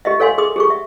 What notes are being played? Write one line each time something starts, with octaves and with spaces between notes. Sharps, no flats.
G4 D#5 E5
A4 C#5 F5 G#5 C6
G#4 C6 D#6
G4 G#4 C#6
E5